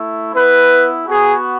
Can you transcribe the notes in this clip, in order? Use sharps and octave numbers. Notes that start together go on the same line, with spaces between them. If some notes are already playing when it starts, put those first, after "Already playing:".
Already playing: A3 E4
B3 E4 B4
B3 F#4 G#4